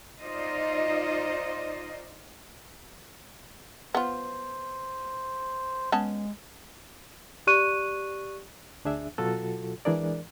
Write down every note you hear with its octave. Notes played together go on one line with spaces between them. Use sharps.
D#4 F4 C5 D5 D#5
B3 F4 C5
G#3 B3 C#4 A5
G4 D5 C#6 F#6 D#7
D2 D4 G#4 E5
B2 F#3 F4 F#4 A4
E3 G#3 D4 G#4 A#4 D5